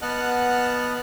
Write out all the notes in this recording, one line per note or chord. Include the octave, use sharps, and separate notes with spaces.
B3 D#5 F#5 A5 F6 F#6